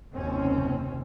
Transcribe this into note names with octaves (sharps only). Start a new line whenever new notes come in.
F#1 D#2 C3 C4 C#4